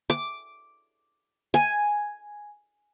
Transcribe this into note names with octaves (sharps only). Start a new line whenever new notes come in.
D6
G#5